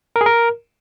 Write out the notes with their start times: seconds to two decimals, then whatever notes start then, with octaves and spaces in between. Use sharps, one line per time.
0.16 A#4
0.21 G#4
0.26 A#4